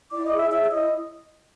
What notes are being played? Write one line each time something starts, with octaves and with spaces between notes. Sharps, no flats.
E4 D5 D6
D#5 D#6
G#4
E5 E6
C#5 E5 E6
E6
E4 D#5 D#6